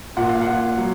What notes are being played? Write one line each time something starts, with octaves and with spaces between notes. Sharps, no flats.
A#2 F#5
F5
F#5
A#2
F#3